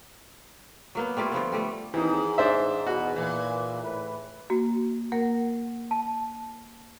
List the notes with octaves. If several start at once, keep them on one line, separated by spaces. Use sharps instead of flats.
F#3 A#3 B3
G3 A3 E4 F4
D3 F3 B3
G3 A3
D#2 G#2 E3 C4 D#4
A1 D4 D#4 C5 E5
E2 B2 F#4
A#2 E3
A2 E4 B4
A#3 F#4
A#3 A#4 F#5
A5